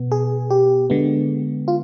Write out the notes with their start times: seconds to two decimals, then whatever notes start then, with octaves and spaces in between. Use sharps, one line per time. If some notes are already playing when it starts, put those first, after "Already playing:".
Already playing: B2 B3
0.12 G#4
0.50 G4
0.90 D3 G#3 B3
1.68 F4